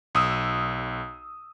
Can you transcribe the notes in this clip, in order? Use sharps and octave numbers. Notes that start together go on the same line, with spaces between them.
B1 D#6 E6